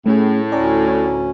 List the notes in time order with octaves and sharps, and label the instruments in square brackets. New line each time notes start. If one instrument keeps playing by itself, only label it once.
[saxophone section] A2 [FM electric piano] A3 C#4 G#4
[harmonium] D2 C#4 [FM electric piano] D5 G#5 A#5